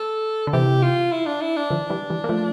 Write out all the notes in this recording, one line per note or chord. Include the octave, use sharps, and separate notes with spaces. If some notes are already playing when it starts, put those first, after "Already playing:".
Already playing: A4
D3
C3 E3 G4
F4
E4
D4
E4
D4
D3 F3
E3 G3
E3 G3
A#3
F3 A3